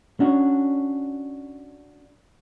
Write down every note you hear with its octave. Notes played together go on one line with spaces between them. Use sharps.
C#4 D4 F#4